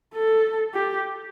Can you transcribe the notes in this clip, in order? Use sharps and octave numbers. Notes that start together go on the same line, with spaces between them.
A4
G4